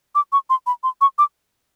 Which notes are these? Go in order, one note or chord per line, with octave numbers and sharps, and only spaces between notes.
D6
C#6
C6
B5
C6
C#6
D6